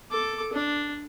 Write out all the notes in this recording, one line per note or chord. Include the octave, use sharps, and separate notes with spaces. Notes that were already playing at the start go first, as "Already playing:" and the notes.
A4 D6
D4